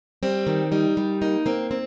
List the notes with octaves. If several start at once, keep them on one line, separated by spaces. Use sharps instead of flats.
G3 C4
D#3
G3 D#4
G3
A#3 D#4
A#3 C4
C4